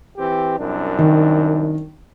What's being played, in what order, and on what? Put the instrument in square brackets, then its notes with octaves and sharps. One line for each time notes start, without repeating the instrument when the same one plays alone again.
[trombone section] E3 C4 G4
C2 F#2 D4
[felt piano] D#3